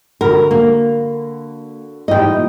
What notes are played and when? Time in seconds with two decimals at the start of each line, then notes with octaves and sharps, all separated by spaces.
0.21 D3 F#4 A#4 B5
0.51 A#3
2.08 G#2 E3 G3 D#5 G5
2.32 A#2 E4